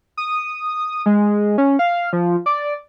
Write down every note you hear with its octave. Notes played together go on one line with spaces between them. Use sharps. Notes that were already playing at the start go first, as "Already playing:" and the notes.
D#6
G#3
C#4
F5
F3
D5